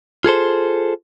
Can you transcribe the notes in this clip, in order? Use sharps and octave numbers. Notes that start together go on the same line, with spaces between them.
F4 G#4 A4 C5